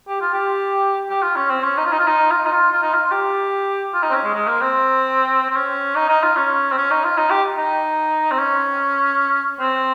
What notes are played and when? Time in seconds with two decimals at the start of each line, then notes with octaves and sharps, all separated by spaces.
0.08 G4
0.21 F4
0.34 G4
1.10 G4
1.22 F4
1.36 C#4
1.50 C4
1.64 C#4
1.77 D#4
1.85 F4
1.92 D#4
1.99 F4
2.07 D#4
2.31 F4
2.46 D#4
2.51 F4
2.72 F4
2.82 D#4
2.94 F4
3.11 G4
3.94 F4
4.03 D#4
4.10 C4
4.13 C#4
4.24 G#3
4.34 G#3
4.47 A#3
4.61 C4
5.50 C4
5.56 C#4
5.95 D#4
6.09 D#4
6.23 F4
6.36 C#4
6.71 C4
6.77 C#4
6.91 D#4
7.04 F4
7.17 D#4
7.30 G4
7.58 D#4
8.31 C4
8.39 C#4
9.60 C4